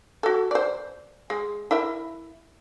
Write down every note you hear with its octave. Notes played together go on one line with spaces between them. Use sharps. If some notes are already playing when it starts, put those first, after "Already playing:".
F#4 A4
C5 D5
G#3
E4 A#4 E5